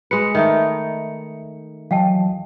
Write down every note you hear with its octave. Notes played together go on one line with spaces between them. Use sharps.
G#3 B4 C#7
D#3 A3 D#4 D#5 E5
E3 F#3 D#5 F5 G5 A5